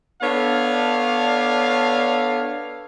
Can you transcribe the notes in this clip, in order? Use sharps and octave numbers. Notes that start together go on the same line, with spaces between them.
B3 D4 A4 C#5 D5 F5